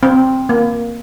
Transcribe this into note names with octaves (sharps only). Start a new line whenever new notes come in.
C4
A#3